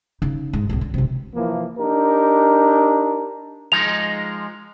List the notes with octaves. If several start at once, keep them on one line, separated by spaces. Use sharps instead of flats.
C#3 D#4
G#2
C2 A2
D3
G#1 C3
E3 F3 A#3
D4 D#4 G4 A#4
F3 G#3 D#4 F7